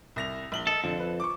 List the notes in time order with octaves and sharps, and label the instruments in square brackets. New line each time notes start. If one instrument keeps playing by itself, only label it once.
[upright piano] C2 A#6 F7
A#1 F#7 G7
[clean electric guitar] A4 [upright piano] D#5
[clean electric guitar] F2 [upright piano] D3
[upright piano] B4
C#6 D6